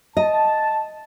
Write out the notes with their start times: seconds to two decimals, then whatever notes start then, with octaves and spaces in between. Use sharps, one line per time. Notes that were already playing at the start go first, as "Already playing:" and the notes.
0.17 D#5 A5